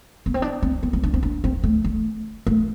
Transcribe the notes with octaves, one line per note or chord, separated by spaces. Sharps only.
B3
C4
D4
C4
B3
C4
D4
C4
D4
C4
A3
A3
A3